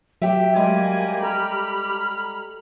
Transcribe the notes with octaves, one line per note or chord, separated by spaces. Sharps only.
F#3 G4 E5 G5
G3 G#3 A#3 G4 G#5
A4 A#5 B5 F6